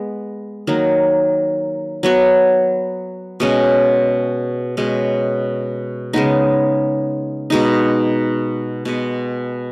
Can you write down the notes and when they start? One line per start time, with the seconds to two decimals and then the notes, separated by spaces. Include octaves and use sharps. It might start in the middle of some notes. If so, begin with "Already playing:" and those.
Already playing: G#3 B3
0.67 D#3 F#3 A#3 D#4
2.03 F#3 B3 F#4 C#5
3.40 B2 G#3 C#4
4.77 B2 G#3 C#4
6.13 C#3 G#3 B3 D#4
7.50 B2 G#3 D#4
8.85 B2 G#3 B3